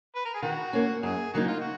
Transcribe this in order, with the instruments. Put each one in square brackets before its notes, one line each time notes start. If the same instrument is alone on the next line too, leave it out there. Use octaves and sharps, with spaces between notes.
[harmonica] B4
A#4
G#4
[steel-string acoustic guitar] D#3 [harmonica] F#4
[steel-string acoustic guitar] A#3 C#4
[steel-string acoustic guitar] F#2 [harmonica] G#4
[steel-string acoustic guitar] C#3 F#3 A#3 D#4 [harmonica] F#4
[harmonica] F4
F#4